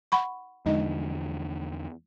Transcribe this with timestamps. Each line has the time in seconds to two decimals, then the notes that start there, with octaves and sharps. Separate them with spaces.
0.12 F#5 B5 C#6
0.66 E2 D3 F3 G#3 D#4 D#5